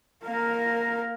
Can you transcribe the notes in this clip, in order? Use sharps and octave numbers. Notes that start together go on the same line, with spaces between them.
A#3 A#4